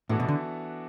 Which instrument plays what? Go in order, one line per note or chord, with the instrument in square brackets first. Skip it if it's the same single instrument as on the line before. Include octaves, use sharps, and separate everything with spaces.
[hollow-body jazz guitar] A2 [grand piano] E3 B3 D4 F#4 A4
[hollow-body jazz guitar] B2
D3